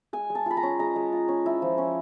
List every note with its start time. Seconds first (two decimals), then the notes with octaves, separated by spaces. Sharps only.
0.13 G#3 G#5
0.30 G#3
0.35 A5
0.46 F4 B5
0.57 A#5
0.63 C#4
0.79 G#3 A#5
0.96 G#3
1.12 F4
1.28 C#4
1.46 E4
1.62 F3
1.78 C#4